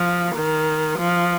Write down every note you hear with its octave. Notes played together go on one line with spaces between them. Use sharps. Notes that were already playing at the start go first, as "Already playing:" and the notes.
Already playing: F3
D#3
F3